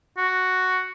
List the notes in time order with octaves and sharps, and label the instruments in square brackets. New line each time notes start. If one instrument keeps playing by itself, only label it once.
[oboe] F#4